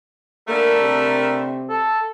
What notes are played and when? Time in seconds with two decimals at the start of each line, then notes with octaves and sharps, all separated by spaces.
0.48 D3 G3 A3 A#3 A#4
0.81 C3
1.69 A4